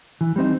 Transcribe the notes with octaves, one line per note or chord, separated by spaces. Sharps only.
E3
G3 C4 D#4